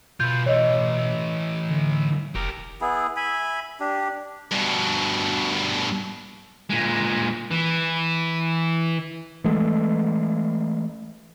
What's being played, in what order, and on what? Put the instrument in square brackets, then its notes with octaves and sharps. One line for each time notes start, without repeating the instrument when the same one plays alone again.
[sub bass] B2 [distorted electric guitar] F4 B4 [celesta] G6
[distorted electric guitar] E3 A3 [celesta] C#5 D#5
[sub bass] D3
[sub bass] F1 [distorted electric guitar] G4 A#4
[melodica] B3 E4 G#4
E5 G#5 B5
D4 G4
[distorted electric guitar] G2 B2
A#2 G#3
E3
[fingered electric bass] E3 G#3 A3